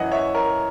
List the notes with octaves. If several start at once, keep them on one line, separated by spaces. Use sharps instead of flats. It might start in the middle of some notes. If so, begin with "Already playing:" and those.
Already playing: F#2 E3 D#5 F#5
C#5 E5
A#4 C#5